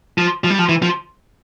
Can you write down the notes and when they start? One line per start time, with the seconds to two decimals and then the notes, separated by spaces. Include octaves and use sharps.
0.18 F3
0.44 F3
0.50 G3
0.59 F3
0.69 E3
0.82 F3